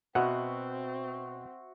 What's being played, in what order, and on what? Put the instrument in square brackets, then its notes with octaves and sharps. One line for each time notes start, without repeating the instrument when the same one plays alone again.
[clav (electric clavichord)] B2 [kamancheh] C4 [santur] F#4 C5 E5 [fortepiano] F#5